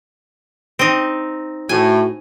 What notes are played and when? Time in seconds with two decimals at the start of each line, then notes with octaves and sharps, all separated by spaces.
0.79 C4 D#4
1.69 A2 F#4 G#5